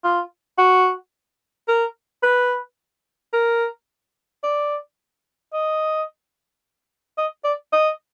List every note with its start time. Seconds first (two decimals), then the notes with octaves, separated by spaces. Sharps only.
0.04 F4
0.59 F#4
1.68 A#4
2.23 B4
3.33 A#4
4.44 D5
5.53 D#5
7.18 D#5
7.45 D5
7.73 D#5